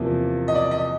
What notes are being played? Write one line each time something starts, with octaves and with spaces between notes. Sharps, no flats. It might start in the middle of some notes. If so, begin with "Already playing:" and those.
Already playing: E2 C3 F3 A#3
D#5
D5
D#5